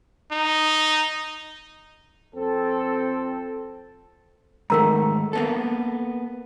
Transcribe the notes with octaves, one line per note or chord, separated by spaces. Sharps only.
D#4
F2 C4 A4
G#2 D#3 A3 A#4 A#5
A#3 B3 A4